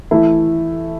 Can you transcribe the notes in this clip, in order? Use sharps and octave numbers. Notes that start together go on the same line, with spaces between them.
E3 A3 E4